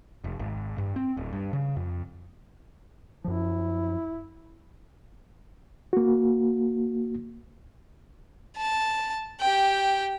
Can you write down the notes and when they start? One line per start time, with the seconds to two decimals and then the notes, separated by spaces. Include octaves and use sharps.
0.24 F1
0.39 G#1
0.78 G2
0.96 C4
1.17 D1
1.33 G2
1.53 C#3
1.76 F2
3.24 F#2 F3 E4
5.93 A#3 F#4
8.57 A5
9.41 G4 G5